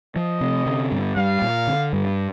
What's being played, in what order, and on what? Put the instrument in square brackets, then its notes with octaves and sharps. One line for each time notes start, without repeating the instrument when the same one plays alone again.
[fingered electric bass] F3 [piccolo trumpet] D#5
[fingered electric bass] C3
D3
G2
[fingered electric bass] G3 [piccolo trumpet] F5
[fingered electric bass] A#2
D3
G2